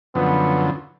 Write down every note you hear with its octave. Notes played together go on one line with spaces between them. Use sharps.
F#2 D3 F3 B3